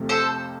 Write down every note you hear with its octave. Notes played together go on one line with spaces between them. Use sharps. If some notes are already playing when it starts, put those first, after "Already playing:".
Already playing: F2 C3 F3 A3
A4 C5